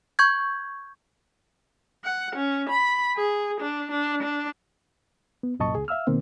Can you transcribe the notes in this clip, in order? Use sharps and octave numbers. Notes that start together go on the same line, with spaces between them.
C#6 G6 G#6
F#5
C#4
B5
G#4
D4
D4
D4
B3
C2 F#2 A#2 D#5 A5 C#6
C#2 G#4
E5 F5 E6 F6
B2 D#3 A#3 C4